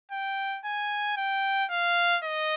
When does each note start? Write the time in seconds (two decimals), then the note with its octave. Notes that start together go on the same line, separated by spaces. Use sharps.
0.11 G5
0.65 G#5
1.17 G5
1.70 F5
2.24 D#5